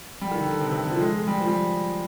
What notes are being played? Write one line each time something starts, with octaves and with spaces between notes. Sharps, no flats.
G3
D#3
D3
D3
C3
C3
D3
F3
G#3
G#3
G3
F3
G3